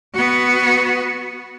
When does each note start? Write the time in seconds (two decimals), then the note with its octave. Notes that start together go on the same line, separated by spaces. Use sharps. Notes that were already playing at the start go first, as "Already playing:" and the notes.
0.14 B3 F#4